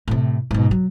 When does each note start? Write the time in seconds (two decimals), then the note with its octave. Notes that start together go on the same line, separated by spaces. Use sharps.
0.08 A2 C3
0.51 G#2 B2
0.71 F#3